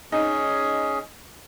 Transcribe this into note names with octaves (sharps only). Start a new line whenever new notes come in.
C#4 D#4 G#4